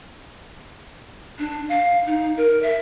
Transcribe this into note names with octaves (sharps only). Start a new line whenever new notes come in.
D4
F5
D#4
A#4
E5